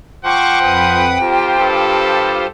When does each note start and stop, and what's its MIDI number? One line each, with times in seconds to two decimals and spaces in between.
0.25 1.06 53
0.25 0.59 72
0.25 1.22 78
0.25 2.15 79
0.25 0.59 85
0.25 0.59 86
0.62 1.18 41
0.62 1.18 71
0.62 1.18 87
1.19 1.56 41
1.19 2.47 65
1.19 2.47 67
1.19 2.47 72
1.59 2.44 43
1.59 2.50 69